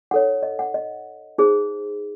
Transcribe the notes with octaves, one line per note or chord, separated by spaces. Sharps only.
D#4 A4 C#5 F#5
D#5
F#5
D#5
D#4 G#4 C5